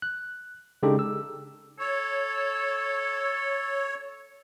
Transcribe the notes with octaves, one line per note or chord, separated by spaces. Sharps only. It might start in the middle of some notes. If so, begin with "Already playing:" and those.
F#6
C#3 G#3 D4 D#4 G4 A4
E6
A4 C#5